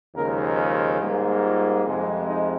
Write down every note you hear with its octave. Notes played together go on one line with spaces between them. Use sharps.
D#2 C#3 F3 G#3 A#4
G#4
G#2 G3 A#3
F4
F2 C3 F3 G#3
D#4